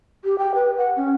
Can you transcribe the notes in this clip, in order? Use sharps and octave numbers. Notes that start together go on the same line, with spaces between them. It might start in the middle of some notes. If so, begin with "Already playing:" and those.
G4
G5
B4
F#5
C#4